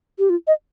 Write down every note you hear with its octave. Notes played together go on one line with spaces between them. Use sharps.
G4
F4
D#5